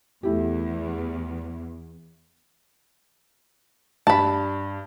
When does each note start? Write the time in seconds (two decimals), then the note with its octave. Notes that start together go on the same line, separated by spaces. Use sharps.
0.23 E2 A3 E4 G4
4.07 G2 A5 B5